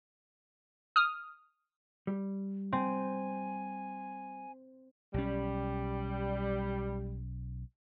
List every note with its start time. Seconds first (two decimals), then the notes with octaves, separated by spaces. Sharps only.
0.96 D#6 F6
2.07 G3
2.72 C4 G#5
5.14 B1 G3 C#4